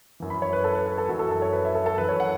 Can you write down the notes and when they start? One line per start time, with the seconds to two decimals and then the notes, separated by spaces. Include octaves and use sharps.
0.20 F#2 E3
0.30 B5
0.42 C#5
0.53 B4
0.64 A4
0.75 B4
0.86 B4
0.98 A4
1.08 F#2 E3 F#4
1.19 A4
1.31 A4
1.42 C#5
1.53 B4
1.65 E5
1.75 A4
1.86 A4
1.97 F#2 E3 B4
2.09 C#5
2.20 F#5